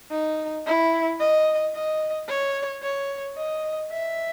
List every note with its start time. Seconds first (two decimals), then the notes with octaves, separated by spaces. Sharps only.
0.11 D#4
0.66 E4
1.20 D#5
1.75 D#5
2.28 C#5
2.83 C#5
3.37 D#5
3.92 E5